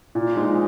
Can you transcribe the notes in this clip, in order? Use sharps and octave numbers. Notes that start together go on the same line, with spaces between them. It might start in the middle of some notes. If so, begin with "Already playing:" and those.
A#2
F3 G#3 D#4